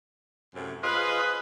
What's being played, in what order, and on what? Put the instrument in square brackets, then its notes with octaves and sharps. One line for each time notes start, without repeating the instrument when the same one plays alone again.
[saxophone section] F#2 A2 C3
[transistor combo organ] F4 C5 D#5 [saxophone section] G#4 B4